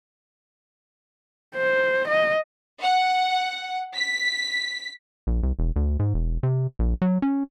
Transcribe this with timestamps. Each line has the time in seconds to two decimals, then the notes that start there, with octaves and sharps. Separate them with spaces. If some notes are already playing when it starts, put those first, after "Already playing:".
1.56 C5
2.08 D#5
2.81 F#5
3.95 B6
5.27 A#1
5.43 C2
5.59 E1
5.76 D2
5.99 G#2
6.14 E1
6.43 C3
6.79 A#1
7.02 F#3
7.22 C#4